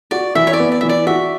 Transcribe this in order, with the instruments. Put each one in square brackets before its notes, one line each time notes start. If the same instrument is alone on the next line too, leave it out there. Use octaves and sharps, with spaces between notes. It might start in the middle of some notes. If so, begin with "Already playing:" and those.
[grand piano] F#4 [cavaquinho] D5
[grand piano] E3 [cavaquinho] E5
[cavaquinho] C#5
D5
[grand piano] B3
[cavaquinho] D5
[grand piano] E3 [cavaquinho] E5
[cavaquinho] D5
[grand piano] F#4 [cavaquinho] E5